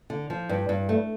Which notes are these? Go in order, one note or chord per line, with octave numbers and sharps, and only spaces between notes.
D3
F3
G2
G2
A3